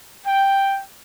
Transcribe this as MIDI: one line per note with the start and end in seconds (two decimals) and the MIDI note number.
0.25 0.80 79